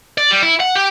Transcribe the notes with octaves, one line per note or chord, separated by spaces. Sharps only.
D5
G3
E4
F#5
G4